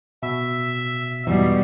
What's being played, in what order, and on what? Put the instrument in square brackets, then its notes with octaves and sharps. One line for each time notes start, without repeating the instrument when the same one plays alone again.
[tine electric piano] B2 [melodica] E5
[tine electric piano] E2 G#2 E3 [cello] B2 G3